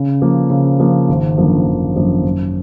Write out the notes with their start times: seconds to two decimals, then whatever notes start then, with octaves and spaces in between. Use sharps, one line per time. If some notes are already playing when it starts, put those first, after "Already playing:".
Already playing: C#3
0.22 F3 A#3
0.50 C#3
0.80 F3 A#3
1.09 G#1
1.38 F#2 D3 F3 A#3
1.66 G#1
1.96 F#2 D3 F3 A#3
2.24 F#2